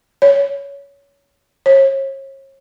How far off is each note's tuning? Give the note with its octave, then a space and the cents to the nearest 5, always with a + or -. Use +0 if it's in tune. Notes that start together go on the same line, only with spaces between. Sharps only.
C#5 +20
C#5 -40